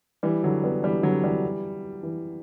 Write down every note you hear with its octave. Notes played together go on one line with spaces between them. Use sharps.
E3 G3
D3 F#3
G3 B3
E3 G3
D3 F#3
E3 G3
E3